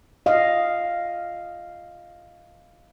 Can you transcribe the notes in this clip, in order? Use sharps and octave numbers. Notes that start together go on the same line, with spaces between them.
D#5 F5